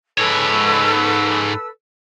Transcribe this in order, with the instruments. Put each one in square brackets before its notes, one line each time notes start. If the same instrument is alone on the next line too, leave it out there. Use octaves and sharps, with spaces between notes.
[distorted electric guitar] G#2 C#5 [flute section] A4 B4 E6